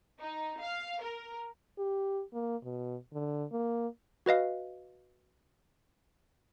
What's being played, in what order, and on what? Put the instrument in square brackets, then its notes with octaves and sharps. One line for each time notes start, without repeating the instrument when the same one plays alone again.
[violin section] D#4
F5
A#4
[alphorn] G4
A#3
B2
D3
A#3
[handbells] F#4 B4 D#5 F5